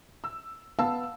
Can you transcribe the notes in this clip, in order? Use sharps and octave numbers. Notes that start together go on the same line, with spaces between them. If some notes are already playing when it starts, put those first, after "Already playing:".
E6
B3 F5 A5 E6